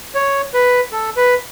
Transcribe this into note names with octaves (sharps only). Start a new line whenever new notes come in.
C#5
B4
A4
B4